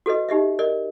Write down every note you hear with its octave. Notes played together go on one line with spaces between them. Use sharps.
F#4 A4 B4 D#5
D#4 G4 D#5 E5
A#4 D5 D#5